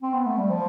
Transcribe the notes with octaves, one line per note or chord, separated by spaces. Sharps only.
C4
B3
A3
G3
F3